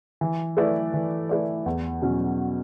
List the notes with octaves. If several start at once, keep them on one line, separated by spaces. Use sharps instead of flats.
E3
A3 E4 B4 D5
E3
A3 E4 B4 D5
E2
B2 F#3 C#4